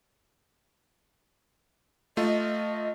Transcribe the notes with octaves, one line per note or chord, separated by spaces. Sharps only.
A3 F4 D#5